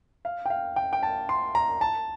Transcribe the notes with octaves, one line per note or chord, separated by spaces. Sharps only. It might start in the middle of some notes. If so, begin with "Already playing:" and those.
F5
G5
F5
G5
G5
A5
C6
A#5
A5